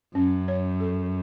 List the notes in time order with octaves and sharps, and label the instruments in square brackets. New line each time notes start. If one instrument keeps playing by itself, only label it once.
[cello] F#2 [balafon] C#4
[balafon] C#5
A4